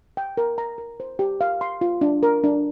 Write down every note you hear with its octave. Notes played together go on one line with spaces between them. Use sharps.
G5
A#4
A#5
A#4
C5
G4
F5
C6
F4
D4
A#4
D4